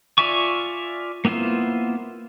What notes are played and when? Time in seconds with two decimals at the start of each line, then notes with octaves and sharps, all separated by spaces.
0.18 F4 D5 E5 G#5 C#6
1.25 A#3 B3 E4 F4 C5